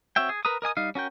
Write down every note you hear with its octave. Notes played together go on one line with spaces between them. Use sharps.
C4 F#4 C#5 E5 G5
G#4
A#4 B4 A#5 D#6
A#4 D#5 G#5 D#6
G3 D#4 F5
C#4 F#4 A#4 G5